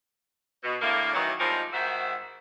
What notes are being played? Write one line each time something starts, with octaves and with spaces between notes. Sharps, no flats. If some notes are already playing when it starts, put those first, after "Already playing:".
B2
A2 D3 A3 A#3
D#3 E3 F#3
F3 G3 G#3 C4 D#4 A#4
G#2 D#3 F#4 C5 E5